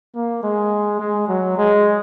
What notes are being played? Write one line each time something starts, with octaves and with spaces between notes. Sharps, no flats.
A#3
G#3
G#3
F#3
G#3